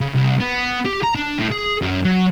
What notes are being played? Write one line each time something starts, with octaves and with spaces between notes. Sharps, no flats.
C#3
C2
B3
G4
A#5
D4
A2
G#4
F#2
F#3